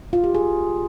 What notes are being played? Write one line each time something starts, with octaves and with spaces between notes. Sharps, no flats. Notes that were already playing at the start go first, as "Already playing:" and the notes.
F4
G4
G#4